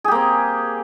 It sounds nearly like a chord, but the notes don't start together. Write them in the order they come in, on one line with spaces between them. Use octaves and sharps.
G#4 G4 A#3 C4